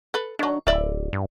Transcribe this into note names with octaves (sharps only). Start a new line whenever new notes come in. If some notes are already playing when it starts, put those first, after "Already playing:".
A4 B4
D#3 F#3 D4
D1 E4 D5 E5
G2